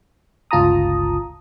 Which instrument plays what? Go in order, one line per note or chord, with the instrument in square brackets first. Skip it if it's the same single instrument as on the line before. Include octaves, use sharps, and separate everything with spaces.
[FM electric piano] G1 C#2 F4 A5 A#5 D#6